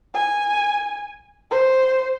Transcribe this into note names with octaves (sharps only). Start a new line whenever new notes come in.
G#5
C5